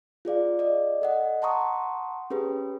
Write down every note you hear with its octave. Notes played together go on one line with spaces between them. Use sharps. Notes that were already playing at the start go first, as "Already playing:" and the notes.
F4 G#4 D5 F5
D5 D#5
A4 D#5 F#5
F#5 A5 A#5 C6 C#6 D#6
C#4 G4 G#4 B4